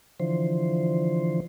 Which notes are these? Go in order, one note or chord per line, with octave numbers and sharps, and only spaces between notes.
D3 E3 F3 C5